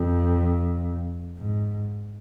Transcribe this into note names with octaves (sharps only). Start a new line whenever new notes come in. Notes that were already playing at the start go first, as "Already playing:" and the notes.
Already playing: F2
G#2